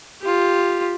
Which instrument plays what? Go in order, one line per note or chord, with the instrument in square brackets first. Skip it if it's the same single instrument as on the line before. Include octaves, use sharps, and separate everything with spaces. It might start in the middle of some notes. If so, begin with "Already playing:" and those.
[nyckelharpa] F4 G4